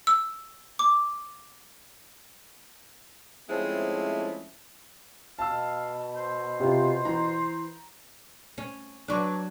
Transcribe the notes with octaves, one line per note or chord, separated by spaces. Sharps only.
E6
D6
F3 G#3 A3 C4 C#4 E4
B2 F5 A5 E6
C5
C3 F4
E3 A#5
C#4
F#3 D4 B4 C#6 D6